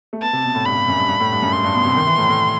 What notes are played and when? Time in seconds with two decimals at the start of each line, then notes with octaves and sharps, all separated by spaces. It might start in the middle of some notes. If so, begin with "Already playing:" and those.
0.13 A3
0.22 B3 A5
0.33 C3
0.44 B2
0.55 A2
0.66 G2 B5
0.76 G2
0.88 F#2
0.98 G2
1.09 G2
1.20 A2
1.32 G2
1.42 F#2
1.53 G2 C6
1.64 G2
1.75 B2
1.85 C3
1.96 D#3
2.07 E3
2.18 A2
2.29 A2